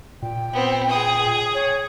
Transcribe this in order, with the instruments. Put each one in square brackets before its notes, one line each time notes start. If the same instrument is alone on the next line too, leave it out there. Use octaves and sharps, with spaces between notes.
[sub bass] A#2 [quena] G5
[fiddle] B3 C4
G#4 D#6
[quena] C#5